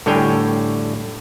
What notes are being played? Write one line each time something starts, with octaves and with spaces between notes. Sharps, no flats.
A2 D3 G3 C#5 G5 G#5